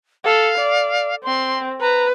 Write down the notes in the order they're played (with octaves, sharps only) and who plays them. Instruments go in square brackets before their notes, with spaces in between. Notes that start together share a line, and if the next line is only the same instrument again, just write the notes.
[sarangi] A4 [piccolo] F5
[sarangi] D5
[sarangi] C4 [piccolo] C6
[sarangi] B4 [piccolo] A#5